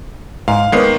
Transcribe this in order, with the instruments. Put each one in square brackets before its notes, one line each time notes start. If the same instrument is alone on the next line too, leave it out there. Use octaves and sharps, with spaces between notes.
[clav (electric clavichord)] G#2 [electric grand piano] F5
[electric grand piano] D#3 A#3 C7 [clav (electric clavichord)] G#3 B3 C#5